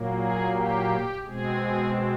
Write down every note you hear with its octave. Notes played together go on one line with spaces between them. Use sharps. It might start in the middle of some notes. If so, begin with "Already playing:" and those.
Already playing: A#2 F#3 A#3
G#4
G4
B2 G#3 C4 G#4